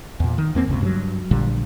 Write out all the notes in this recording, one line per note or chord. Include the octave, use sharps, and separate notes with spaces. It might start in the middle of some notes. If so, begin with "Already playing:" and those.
E2 A#2
D#3
E2 A#3 C4
F#1 C#2 C3
G2 B2 F#3
A#1 A#2 D3 G3